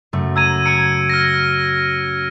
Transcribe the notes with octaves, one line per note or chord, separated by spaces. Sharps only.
F#2 C#3 A3
A5 A#5 E6 G#6 D#7
A#5 E6 G#6 C#7 D7
F6 A#6